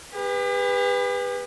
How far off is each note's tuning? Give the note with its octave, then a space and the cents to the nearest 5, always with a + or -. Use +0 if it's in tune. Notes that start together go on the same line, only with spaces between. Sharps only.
G4 +45 B4 +0